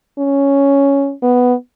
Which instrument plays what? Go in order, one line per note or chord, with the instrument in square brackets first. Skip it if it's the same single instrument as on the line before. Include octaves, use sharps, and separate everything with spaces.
[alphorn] C#4
B3